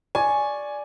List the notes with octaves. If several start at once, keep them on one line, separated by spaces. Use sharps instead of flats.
D5 G#5 C#6